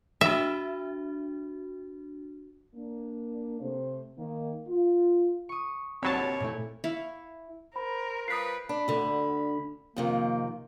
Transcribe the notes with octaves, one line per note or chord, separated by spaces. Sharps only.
D4 F#4 E5
A#3 D4
C3 A3 C5
D#3 A#3
F4
C#6 D#6
G1 D#2 C3 F#3 C4 C#5 A5 B5
A#2 A3 E4
E4 F5 C#6
A#4 C5 B5
G3 F4 B4 D#6 B6 C7
D4 B5
D2 D3
F2 C3 D#3 A#3